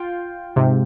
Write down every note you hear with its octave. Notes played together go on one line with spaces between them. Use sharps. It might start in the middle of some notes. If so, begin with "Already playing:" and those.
Already playing: F4 G5
G#2 C3